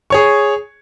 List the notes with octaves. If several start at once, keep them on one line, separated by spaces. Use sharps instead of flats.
G#4 C#5 C#6